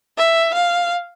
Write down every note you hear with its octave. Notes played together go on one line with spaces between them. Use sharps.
E5
F5